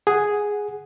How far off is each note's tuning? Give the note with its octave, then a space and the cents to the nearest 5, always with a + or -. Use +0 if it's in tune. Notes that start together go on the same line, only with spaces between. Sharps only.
G#4 +0 F#5 +0